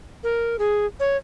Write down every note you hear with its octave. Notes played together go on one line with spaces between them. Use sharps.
A#4
G#4
C#5